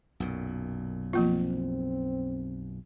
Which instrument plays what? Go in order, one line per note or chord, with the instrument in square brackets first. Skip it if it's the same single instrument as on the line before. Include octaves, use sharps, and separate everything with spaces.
[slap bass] B1 F#2 A#2
[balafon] F3 A#3 F4 [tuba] C4